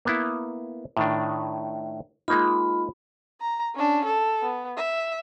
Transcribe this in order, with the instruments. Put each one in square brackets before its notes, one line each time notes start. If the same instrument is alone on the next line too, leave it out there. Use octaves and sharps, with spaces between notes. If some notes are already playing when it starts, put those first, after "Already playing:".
[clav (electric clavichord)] A#3 B3 E4
A2 D#3 D4
[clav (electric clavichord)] G#3 A#3 D#4 [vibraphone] F4 B5
[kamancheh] A#5
C#4 D4
A4
B3
E5